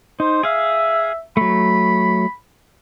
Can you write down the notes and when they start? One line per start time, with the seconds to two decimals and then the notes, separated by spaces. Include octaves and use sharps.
0.20 D#4 C5
0.43 G#4 E5 F5
1.37 F#3 A3 B5